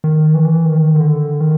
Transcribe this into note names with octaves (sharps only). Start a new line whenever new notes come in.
D#3
E3
D#3
D3
D#3